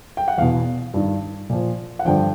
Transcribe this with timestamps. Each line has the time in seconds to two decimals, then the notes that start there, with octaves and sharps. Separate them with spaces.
0.17 G5
0.28 F#5
0.38 E2 B2 F5
0.94 G2 D#3
1.50 A#2 F3
1.99 F#5
2.05 G2 D3 F3 G5